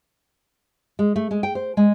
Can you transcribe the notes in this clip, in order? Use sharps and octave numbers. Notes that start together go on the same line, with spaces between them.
G#3
A3
G#3
G5
C5
G#3